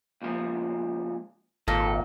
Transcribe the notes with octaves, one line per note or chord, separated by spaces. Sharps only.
C#2 A#2 F3
G#1 A#2 A4